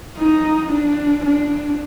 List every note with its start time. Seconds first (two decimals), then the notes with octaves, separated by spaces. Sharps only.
0.19 D#4
0.72 D4
1.26 D4